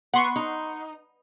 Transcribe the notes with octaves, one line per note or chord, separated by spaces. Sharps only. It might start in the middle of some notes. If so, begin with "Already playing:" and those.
B3 F#5 C6 C#6
D#4